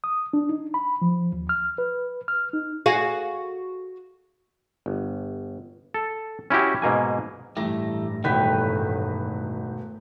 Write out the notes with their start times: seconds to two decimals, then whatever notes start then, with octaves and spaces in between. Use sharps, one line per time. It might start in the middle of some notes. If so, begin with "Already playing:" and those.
0.04 D#6
0.33 D4
0.49 D#4
0.74 B5
1.02 F3
1.33 D#2
1.49 F6
1.78 B4
2.28 F6
2.53 D#4
2.86 F#4 G#4 F5
4.86 G1
5.94 A4
6.50 C#4 E4 F#4 G4
6.82 G#2 B2 A#3 G#5
7.57 A1 G2 E3 G3 A3 G4 A#5
8.24 E1 A2 D#3 F#4 B4 G5 B6